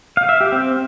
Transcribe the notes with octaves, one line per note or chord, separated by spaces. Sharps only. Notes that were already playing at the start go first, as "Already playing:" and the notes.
F5
E5
G4
C4